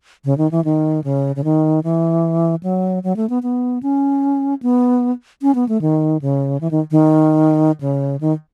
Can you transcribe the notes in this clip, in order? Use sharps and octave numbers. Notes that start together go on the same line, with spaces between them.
C#3
D#3
E3
D#3
C#3
C#3
D#3
E3
F#3
F#3
A3
B3
B3
C#4
B3
C#4
B3
A3
D#3
C#3
E3
D#3
D#3
C#3
D#3